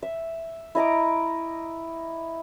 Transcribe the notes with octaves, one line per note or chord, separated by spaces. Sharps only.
E5
E4 D#5 A#5 D6